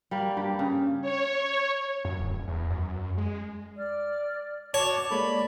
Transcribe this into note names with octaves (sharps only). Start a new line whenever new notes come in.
G3 A#3
G2 G4
C#3
C#5
F#2
D1
E2
F#2
G#3
D5 F6
F#4 C#5 A5 D6
G#3 A#3 A4 D5 B5